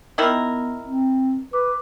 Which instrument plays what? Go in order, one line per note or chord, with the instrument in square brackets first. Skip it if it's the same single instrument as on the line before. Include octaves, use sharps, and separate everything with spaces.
[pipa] D#3 E4 A#4 [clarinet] B3
[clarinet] C4
[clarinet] B4 [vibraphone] D6